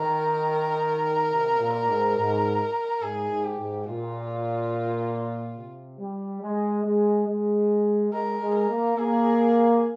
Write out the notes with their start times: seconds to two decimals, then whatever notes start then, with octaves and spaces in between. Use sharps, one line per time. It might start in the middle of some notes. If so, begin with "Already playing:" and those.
Already playing: D#3 A#4
1.32 C3
1.60 A#2
1.89 G#2
2.17 G#2
3.02 G#2 G#4
3.31 G#2
3.44 G4
3.59 G#2
3.87 A#2 F4
5.58 C3
5.99 G3
6.43 G#3
6.85 G#3
7.28 G#3
8.13 G#3 A#4
8.41 G#3
8.55 A#4
8.70 A#3
8.97 A#3 G#4